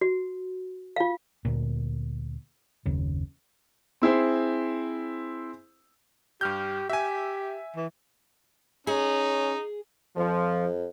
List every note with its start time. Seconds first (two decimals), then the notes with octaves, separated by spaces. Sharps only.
0.01 F#4
0.96 F4 F5
1.45 D2 A#2
2.86 F#1 D#2 C#3
4.02 C4 E4 G#4 C5
6.41 G2 G4 F6 G6
6.89 G4 E5 G#5
7.76 E3
8.87 C#4 D#4 G#4
10.17 F2 F3